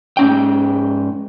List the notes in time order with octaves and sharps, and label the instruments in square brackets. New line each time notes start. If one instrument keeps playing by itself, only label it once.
[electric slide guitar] G#2 C#4 G5